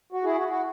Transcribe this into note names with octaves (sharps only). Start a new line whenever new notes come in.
F#4
E4 G#4
F#4
F#4